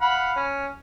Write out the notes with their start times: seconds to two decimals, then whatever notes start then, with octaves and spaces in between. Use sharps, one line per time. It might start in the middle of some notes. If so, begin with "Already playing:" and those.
0.01 F5 F#5 B5
0.36 C#4